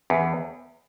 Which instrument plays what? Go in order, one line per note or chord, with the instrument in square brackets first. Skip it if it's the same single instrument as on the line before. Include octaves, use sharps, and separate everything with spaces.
[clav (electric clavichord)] E2